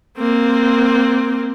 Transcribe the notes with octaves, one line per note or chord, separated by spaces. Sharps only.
A#3 C4